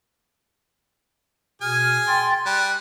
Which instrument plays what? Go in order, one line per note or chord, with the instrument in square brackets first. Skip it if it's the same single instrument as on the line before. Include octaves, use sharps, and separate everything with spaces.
[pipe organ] B2 F6 [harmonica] G#4 G#5
[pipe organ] G5 C6 A6
[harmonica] G3 [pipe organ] F#6